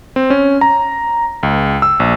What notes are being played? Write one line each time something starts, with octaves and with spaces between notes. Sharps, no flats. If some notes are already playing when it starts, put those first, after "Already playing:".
C4
C#4
A#5
C#2
E6
A#1